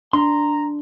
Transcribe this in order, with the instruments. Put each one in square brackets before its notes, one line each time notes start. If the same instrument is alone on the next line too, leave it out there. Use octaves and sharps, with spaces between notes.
[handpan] D4 [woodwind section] A#5 [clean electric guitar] C6